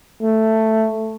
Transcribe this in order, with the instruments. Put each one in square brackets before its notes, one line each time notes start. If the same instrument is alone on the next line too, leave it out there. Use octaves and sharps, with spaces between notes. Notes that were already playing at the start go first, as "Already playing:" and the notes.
[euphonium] A3